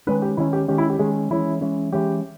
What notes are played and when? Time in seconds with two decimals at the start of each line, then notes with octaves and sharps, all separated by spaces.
0.07 D#3 G#3 C#4 B4
0.22 G4
0.37 D#3 G#3 C#4 E4
0.53 G4
0.68 D#3 G#3 C#4 G4
0.78 E4
0.90 G4
0.99 D#3 G#3 C#4 G#4
1.30 E3 G#3 C#4 E4
1.61 E3 G#3 C#4
1.92 E3 G#3 C#4 G4